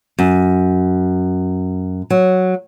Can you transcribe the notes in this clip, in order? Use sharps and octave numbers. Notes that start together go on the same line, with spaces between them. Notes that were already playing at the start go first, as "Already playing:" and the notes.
F#2
F#3